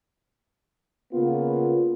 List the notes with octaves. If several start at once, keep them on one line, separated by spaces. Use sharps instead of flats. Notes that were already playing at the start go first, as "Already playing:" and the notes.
C#3 A#3 B3 F4